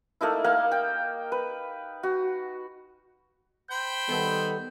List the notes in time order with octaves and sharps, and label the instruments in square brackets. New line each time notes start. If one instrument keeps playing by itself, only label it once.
[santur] A3 A#3 D#4 E4
A#3 F5 F#5
G5
B4
F#4
[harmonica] C5 G5 B5 [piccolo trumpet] G6
[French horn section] D#3 G3 B3 [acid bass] A4